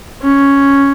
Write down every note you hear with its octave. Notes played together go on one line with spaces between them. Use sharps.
C#4